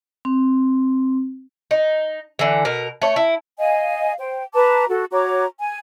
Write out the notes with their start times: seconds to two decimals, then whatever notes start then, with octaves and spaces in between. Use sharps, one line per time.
0.25 C4
1.71 D#4
2.39 D3 E3
2.65 B2 A#4
3.02 A3 C#5
3.16 E4
3.59 D#5 F5 G#5
4.19 C5 G5
4.54 B4 A5 A#5 D6
4.89 F#4 A4
5.12 F#4 C#5 A#5 D6
5.59 G#5